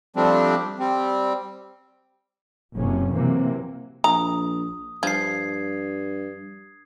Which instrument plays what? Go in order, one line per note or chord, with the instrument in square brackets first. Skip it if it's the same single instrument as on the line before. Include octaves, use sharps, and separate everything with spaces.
[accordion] F3 G3 A3 C4 D4
G3 C4
[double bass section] F#1 C3 C#4
C3 E3 F#3 A#3
[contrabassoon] A#1 [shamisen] A#5 [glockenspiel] D#6
[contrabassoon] G2 [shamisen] F3 [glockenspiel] G#6 C7